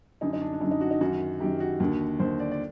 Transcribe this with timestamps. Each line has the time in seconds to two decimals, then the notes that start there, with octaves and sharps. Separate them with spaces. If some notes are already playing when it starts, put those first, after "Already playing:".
0.21 F#2 D3 D#4
0.33 D#4
0.41 D4
0.53 D4
0.60 F#2 D#4
0.64 D3
0.71 D#4
0.81 F#4
0.91 D#4
1.01 F#2 D#3 F#4
1.40 F#2 D#3 G4
1.60 F#4
1.80 D#2 D3
2.19 D#2 D3 C5
2.40 D5
2.52 D5